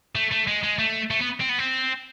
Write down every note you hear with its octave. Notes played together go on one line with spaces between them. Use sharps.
A3
A3
G#3
G#3
A3
A3
B3
C4
B3
C4